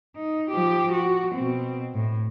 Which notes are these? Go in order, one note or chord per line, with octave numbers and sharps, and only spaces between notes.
D#4
F3 G4
F#4
B2 C4
A2